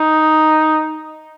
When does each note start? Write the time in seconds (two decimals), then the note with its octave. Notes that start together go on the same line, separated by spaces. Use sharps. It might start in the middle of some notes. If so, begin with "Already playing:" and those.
Already playing: D#4